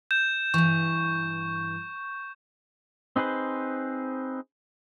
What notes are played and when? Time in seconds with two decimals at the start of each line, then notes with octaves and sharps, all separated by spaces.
0.11 G6 E7
0.54 G2 E3 C#6
3.16 C4 D#4 G#4 B4 C5